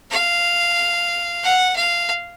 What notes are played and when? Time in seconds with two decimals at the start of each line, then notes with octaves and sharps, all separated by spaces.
0.11 F5
1.44 F#5
1.76 F5